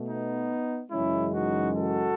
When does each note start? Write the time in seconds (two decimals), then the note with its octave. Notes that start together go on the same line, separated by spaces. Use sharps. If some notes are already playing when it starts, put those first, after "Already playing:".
Already playing: B2 A3
0.08 B3 D#4
0.91 F#2 C#3 E3 G#3 C#4 E4
1.33 D#4 F#4
1.75 F#4 A4